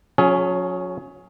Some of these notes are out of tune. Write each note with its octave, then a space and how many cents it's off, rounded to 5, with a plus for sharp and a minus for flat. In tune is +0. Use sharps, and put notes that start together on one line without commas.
F#3 -40 C#4 +0 G#4 +25